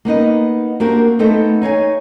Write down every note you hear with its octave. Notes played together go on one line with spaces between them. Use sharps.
A#3 B3 D#4 D#5
A#3 C4 D4 F#4 G4 A#4
A3 B3 C4 D#4 A4
D#4 C#5 F5 G#5